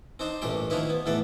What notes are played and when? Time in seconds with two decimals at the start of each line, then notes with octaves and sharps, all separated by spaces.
0.19 C4 D4 D#4 C5
0.42 A1 G2 A#2 A3 G4 G5
0.70 D#3 F3 A#3 D#4 E4 B4
0.90 B3
1.06 E2 A2 A3 A4 B4 D5